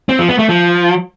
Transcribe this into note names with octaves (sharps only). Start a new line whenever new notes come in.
C4
F3
B3
A3
F3